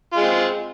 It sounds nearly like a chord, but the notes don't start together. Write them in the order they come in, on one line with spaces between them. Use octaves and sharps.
F4 G#3 C4